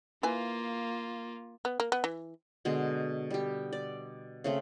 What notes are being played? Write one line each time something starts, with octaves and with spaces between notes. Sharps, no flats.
A#3 E4 F4 B4 G#5
B3
A#3
B3
E3
B2 D3 G#3
G3 G4
D5
C#3 A3 C4